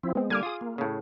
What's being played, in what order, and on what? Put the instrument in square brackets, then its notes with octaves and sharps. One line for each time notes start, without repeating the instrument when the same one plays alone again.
[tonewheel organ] F3 C4 E4
[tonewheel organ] G#3 [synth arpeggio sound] B3 C4
[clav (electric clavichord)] D3 [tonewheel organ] G3 A#3 G#5 [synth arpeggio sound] D6 F6 G#6
[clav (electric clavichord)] F4 G#4 [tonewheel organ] D#6
[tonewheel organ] A#3
[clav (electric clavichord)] A2 C#3